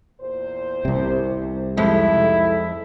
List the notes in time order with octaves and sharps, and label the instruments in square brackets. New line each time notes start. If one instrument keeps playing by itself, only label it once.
[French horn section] E2 A#2 C5
[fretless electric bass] C2 C3
[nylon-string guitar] F2 G#3 [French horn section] D#4 G4 A4 [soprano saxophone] E4